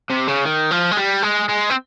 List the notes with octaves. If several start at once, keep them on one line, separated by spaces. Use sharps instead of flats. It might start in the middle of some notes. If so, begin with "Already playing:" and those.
C3
C#3
D#3
F3
G#3
G3
G#3
G#3
C4